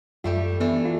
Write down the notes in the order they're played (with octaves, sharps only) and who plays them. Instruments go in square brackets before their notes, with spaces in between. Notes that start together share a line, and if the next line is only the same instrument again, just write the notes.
[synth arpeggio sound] F#2 F4 [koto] G3 A3 G4
[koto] E3 A3 D4 [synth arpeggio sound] B3
[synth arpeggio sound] F4